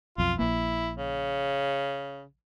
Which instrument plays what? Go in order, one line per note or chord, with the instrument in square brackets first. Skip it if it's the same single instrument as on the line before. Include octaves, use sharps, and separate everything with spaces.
[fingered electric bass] B1 F2 [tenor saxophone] F4
[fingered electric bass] A#1 A#3 [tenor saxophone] E4
[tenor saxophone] C#3